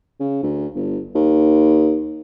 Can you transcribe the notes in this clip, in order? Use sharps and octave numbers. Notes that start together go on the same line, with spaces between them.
C#3
D2
G1
D#2